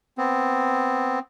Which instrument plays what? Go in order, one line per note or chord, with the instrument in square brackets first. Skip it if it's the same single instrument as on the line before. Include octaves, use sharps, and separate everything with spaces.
[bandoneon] B3 C4